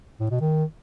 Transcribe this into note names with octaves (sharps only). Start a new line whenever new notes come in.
A2
B2
D#3